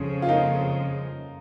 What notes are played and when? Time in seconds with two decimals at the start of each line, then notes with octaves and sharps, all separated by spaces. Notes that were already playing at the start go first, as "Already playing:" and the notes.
Already playing: F2 C#3 F3
0.22 F4
0.28 A#3 D#4